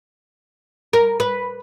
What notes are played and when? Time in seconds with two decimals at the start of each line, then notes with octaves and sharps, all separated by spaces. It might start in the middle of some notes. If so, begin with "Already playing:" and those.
0.93 A#4
1.20 B4